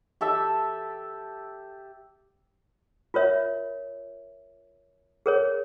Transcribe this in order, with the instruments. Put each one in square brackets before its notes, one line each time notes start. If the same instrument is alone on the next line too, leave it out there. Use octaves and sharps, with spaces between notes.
[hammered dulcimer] G4 A4 E5
[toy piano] F4 A#4 C#5 E5
G#4 A#4 C#5